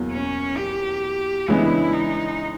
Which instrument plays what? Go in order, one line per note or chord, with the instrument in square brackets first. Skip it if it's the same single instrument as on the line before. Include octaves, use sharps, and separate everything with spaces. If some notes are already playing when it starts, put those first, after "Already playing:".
Already playing: [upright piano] E2 B2 F#3 A#3
[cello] C#4
G4
[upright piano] C#3 E3 G#3 B3 D4 [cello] E4
[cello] D#4